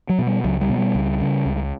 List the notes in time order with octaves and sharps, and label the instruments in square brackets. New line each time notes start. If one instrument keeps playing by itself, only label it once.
[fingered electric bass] F#3
B2
G3
C#2 F#3
G3
B2
G3
C#2
C#3
C#2